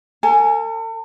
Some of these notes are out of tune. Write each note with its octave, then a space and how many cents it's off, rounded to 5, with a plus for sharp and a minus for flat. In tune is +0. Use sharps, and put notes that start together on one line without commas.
A4 +45 G#5 +0